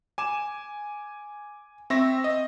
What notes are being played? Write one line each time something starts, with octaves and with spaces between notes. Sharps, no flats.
G#5 D6 E7
C4 E5 C#6 A#6
D#5